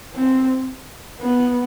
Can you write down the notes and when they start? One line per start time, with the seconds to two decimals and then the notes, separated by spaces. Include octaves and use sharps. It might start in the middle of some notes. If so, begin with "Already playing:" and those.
0.15 C4
1.20 B3